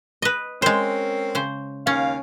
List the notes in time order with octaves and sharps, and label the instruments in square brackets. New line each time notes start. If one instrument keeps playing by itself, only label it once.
[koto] B4 D#5
[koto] G#3 C5 [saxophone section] C4 C#4 A#4
[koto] C#3 C5
[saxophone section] D#2 F5 [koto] C#4